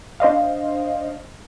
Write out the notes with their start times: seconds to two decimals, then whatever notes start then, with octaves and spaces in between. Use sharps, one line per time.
0.20 D4 C5 D#5 F5